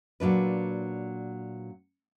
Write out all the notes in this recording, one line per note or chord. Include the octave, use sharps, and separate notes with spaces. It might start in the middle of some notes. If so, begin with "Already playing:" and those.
A#2 F#3 D4 B4